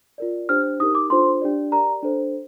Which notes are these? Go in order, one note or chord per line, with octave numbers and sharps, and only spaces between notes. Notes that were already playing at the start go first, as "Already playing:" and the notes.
F4 A#4 D5
D4 G4 C5 F6
D#4 G4 A#4 D#6
D6
D4 F4 A4 C5 C6
D4 G4 D5
G4 A#4 D5 A#5
D4 A4 C5